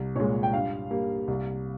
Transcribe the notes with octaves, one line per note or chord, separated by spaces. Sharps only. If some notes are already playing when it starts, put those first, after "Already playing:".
Already playing: C2
A#2 G#3 C#5
G5
G2 F5
G3 A#3
C2